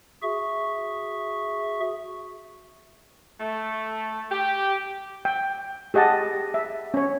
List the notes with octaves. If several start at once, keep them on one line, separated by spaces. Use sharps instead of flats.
F#4 G#4 E5 C#6
A3
G4
G5
G4 G#4 D#5 F#5 A5
E5
C#4 C#5